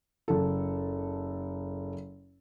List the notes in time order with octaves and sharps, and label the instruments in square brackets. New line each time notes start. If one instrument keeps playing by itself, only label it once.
[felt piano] F#1 A4